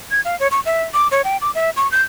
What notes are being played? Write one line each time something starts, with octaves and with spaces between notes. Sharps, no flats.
G#6
F5
C#5
C#6
E5
D6
C#5
G5
D6
E5
C#6
G6